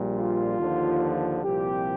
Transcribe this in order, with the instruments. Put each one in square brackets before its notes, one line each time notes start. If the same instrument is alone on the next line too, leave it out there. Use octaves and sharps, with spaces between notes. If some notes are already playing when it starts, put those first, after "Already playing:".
Already playing: [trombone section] A#1 A#2 G3
F4
D#2 D3 F3
C2 A#2 F3 C4 G4